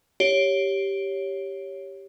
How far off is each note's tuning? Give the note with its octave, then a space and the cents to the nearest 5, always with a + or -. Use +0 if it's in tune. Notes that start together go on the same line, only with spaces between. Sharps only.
G4 +0 C#5 +0